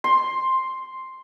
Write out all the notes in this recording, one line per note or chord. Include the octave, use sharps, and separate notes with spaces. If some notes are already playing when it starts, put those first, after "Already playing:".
C6